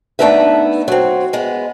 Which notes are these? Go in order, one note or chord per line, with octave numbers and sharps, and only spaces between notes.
A3 B3 D4 D#4 B4 E5
F#3 C4
G#3 B3